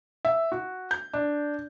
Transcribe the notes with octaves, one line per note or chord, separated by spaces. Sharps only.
E5
F#4
G6
D4